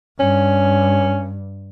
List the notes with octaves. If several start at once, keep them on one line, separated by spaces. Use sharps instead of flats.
G2 C#4